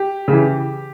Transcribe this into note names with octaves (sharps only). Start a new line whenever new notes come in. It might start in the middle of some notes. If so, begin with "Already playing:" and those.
Already playing: G4
C#3 E3